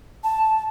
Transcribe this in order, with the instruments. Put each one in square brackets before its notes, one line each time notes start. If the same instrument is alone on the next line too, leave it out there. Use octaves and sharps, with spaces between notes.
[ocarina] A5